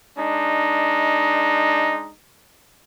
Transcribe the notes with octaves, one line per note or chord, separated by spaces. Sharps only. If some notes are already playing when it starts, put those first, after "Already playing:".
G#3 D4 D#4